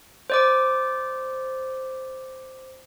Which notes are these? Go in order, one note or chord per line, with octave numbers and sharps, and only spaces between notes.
C5 D5 D6